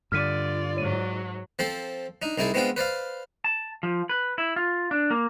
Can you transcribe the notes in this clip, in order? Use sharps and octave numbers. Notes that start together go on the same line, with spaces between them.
G2 D3 F4 D5 F6 B6 D#7
G#2 F#3 C#5 D#7
F3 C4 A4 C5
D4 D#4
C2 D#4 E4 G#4 D5
G#3 B3 C4 D4 F4 G5
B4 C5 D5 F5
A5
F3
B4
E4
F4
D4
A#3